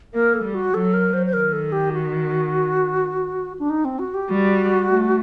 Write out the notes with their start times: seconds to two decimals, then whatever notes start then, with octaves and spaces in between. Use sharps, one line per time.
0.14 A#3 A#4
0.34 A4
0.44 G3
0.54 F#4
0.74 F#3 A4
0.94 A#4
1.13 C5
1.26 C5
1.33 D#3 A#4
1.53 A4
1.72 G4
1.93 F#4
3.59 D4
3.70 D#4
3.85 C4
3.99 F#4
4.14 G4
4.29 G3 F#4
4.88 A3